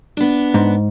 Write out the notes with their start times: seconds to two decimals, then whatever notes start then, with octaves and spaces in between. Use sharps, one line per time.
0.17 B3 D4
0.54 G#2